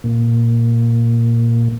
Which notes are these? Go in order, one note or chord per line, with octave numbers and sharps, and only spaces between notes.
A#2